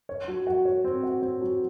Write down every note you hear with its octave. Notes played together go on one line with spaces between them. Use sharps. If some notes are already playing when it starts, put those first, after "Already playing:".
C#5
F#3
F#4
C#5
C4
F#4
C4
F#3